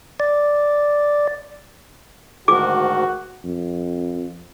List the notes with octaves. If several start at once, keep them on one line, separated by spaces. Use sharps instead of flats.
D5
D2 G#2 D#3 F#4 G#4 D6
F2